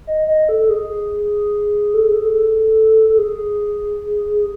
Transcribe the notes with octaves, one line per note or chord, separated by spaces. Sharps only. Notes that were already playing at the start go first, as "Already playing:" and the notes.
D#5
D#5
A4
G#4
A4
G#4
A4
A4
G#4